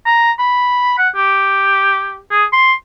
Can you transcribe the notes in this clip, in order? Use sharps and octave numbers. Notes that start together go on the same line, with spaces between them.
A#5
B5
F#5
G4
G#4
C6